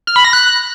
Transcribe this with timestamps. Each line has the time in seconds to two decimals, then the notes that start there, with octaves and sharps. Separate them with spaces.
0.07 F6
0.16 B5
0.25 A#6
0.33 F#6